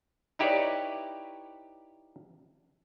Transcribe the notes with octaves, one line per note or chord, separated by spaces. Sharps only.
D#4 E4 G4 B4 C#5 D5